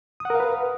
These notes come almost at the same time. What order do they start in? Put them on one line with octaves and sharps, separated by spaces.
D#6 F#5 A#4 F5 B4